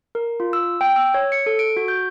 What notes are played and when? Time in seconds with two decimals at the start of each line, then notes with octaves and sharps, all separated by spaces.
0.15 A#4
0.40 F4
0.53 E6
0.81 G5
0.96 E6
1.14 C#5
1.32 C#7
1.46 A4
1.59 D7
1.77 F#4
1.88 G6